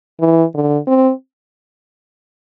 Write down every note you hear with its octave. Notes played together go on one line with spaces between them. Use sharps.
E3
D3
C4